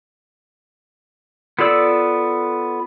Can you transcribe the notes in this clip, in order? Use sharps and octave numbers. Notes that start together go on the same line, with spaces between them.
B3 F4 A4 D5 E6